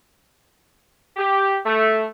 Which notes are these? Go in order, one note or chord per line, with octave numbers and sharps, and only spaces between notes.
G4
A3